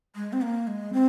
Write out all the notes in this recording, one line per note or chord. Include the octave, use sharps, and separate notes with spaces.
G#3
C4
A#3
G#3
C4